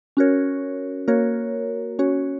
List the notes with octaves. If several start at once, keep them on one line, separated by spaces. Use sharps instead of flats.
C#4 F#4 A#4 C#5
A#3 F#4 A#4 C#5
C#4 F#4 C#5